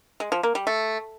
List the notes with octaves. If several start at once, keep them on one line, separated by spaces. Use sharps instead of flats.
G#3
F3
A#3
G3
A3